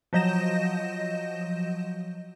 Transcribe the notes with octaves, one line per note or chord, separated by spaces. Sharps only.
F3 F#3 D#5 G6 A#6 E7